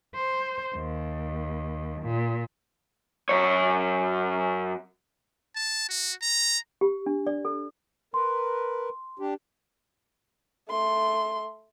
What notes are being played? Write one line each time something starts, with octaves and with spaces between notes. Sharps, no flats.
C5
D#2
A#2
F#2 C#5
A5
F#4
A#5
G4
D4
D5
A4
A#4 B4 C6
D4 G4
A3 C6